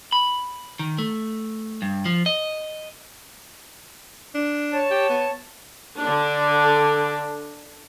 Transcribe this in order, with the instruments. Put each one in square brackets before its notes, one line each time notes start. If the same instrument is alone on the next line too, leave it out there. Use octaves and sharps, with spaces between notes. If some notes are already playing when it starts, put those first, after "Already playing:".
[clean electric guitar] B5
D#3
A3
G2
F3
D#5
[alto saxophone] D4
[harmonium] C#5 A5
[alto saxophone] G4
B3
[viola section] D3 D4